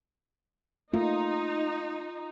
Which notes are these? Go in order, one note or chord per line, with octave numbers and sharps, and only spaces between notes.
A3 A#3 D#4 F4